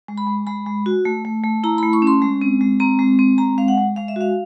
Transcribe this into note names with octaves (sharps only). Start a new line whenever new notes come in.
G#3
B5
G#3
G#3 B5
G#3
F#4
A3
A3
A3
E4 A#5
B5
A3
C#6
C#4
C6
G#3
C4
G#3
C4 A#5
G#3
C4
G#3 A#5
G#3 F5
F#5
G#3
G#3 F5
E5
F#4 F5